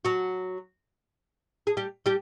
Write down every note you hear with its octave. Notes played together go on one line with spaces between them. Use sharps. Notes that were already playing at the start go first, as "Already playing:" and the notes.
F#3 F#4
G#4
G3 G4
G3 G4